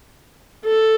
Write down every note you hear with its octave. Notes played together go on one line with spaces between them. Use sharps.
A4